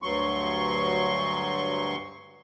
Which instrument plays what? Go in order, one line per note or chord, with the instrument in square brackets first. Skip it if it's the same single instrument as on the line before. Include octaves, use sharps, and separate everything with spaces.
[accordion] D2 G2 F#3 C6 C#6